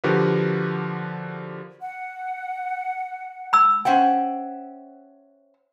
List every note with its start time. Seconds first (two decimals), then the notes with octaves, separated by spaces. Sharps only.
0.04 D3 F3 F#4 G4 A#4 B4
1.81 F#5
3.53 B5 E6
3.85 C#4 C5 E5 F#5 G5